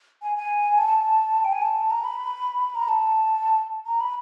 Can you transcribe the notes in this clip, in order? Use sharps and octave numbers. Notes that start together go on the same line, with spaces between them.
G#5
G#5
A5
G5
G#5
A5
A#5
B5
A#5
A5
A#5
B5